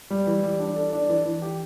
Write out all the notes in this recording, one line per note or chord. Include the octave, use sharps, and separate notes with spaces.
G3
E3
G3
D4
A4
D4
E3
E3
G4